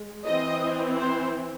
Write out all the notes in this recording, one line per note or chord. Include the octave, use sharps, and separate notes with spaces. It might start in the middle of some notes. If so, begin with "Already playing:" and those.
Already playing: G#3
E3 C4 D#5
C5